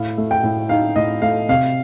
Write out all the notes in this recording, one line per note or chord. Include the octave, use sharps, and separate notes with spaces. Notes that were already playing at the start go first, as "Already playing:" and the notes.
Already playing: A2 F5
A3
G5
A2
D#4 F5
A2 D#5
A3 F5
C3 F5